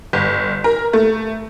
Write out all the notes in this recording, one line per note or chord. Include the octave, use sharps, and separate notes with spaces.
G1
A#4
A3